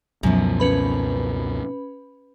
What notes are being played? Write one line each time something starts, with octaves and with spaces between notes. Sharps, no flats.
C#2 F#2 B2 F3 B3
C#4 B4 B5